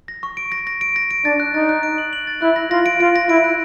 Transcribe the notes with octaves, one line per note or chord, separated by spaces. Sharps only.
A#6
C#6
D7
A#6
A#6
D7
A#6
D7
D4 A6
F#6
D#4 A6
F#6
D7
F#7
F#7
A6
E4 F#6
A#6
F4 A#6
D7
F4 D7
A#6
E4 D7
F#6